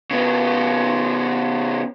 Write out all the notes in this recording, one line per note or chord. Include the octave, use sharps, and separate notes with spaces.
C#3 B3